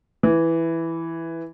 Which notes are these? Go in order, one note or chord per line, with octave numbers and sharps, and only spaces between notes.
E3